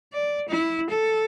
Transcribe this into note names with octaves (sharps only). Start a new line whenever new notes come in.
D5
E4
A4